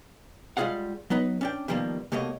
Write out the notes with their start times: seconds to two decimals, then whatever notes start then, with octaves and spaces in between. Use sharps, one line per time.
0.57 G3 G#3 F4 G#4 F5 F#5
1.10 F#3 B3 D#4 B4
1.41 C#4 D4 G5
1.68 B2 D#3 F3 G3 A#3
2.12 C2 B2 A3 A#3 C#5 D#5